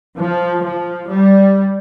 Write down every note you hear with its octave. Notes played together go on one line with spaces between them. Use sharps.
F3
F3
G3